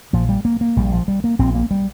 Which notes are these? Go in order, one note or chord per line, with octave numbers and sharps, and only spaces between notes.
A#1 A#2 F3
G3
A#3
A#3
A#1 A#2 G3
F3
G3
A#3
A#1 A#2 C4
A#3
G3